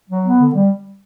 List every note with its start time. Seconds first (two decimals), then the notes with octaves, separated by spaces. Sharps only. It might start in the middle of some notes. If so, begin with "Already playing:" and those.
0.09 F#3
0.24 B3
0.39 D3
0.54 G3